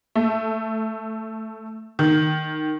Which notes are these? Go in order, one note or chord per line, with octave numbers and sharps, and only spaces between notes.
A3
D#3